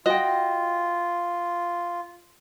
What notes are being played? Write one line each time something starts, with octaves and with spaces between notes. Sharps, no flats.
F4 F#4 D#5 G5